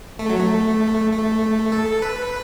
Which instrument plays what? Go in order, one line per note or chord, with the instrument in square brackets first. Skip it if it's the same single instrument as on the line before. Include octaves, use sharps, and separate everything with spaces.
[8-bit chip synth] A3
F#3
A3
A3
A4
B4